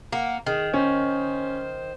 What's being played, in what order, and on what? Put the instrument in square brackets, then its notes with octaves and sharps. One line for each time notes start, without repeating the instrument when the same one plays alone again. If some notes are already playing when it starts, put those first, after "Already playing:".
[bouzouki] A#3 [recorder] F#5
[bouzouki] D#3 [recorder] G#4
[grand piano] C#4 [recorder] C5